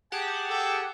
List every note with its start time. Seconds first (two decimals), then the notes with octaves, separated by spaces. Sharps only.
0.12 G4 G#4 F#5 A5
0.49 A4 G5